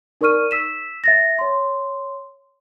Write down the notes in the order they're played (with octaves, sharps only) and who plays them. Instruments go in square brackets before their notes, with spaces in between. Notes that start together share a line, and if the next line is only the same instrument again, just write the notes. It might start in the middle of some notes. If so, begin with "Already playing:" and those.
[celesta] D#4 A#4 D5 C#6 F6 D#7
E6 B6 E7
E5 A6 A#6
C#5 C6